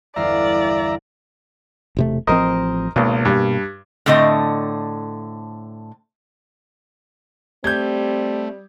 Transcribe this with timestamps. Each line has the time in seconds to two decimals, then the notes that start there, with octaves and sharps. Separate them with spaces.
0.16 G1 E2 D5 E5 F5 A#5
1.97 E1 C3 A3
2.27 A1 F3 C4 A#4 C5 D#5
2.96 G#1 C#2 B2 A#3
3.25 G2
4.06 A2 D3 A3 C4 D#5
7.64 G3 A3 C4 G6 G#6